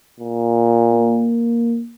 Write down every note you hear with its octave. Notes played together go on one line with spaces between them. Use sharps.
A#2
A#3